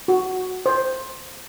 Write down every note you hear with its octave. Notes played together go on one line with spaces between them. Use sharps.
F#4
C5